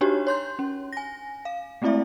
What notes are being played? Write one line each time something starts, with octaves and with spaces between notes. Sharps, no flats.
D4 D#4 F#4 G4 C#5
C#5 C6 G6
C#4
G#5 A#6
F5
G#3 A3 C4 E4 D5 E5